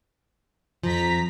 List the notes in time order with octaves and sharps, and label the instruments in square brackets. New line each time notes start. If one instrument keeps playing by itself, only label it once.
[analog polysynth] F2 A#5 B6 [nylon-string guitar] F3